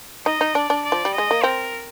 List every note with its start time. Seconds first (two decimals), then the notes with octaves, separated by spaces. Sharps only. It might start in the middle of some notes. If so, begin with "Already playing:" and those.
0.26 D#4 D#5
0.41 D#4
0.55 D4 D5
0.70 D4
0.85 D5
0.92 F3
1.05 G3
1.14 G#3 D#5
1.31 A#3
1.43 C4 A#4